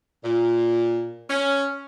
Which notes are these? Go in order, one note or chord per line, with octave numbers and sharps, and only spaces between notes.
A#2
C#4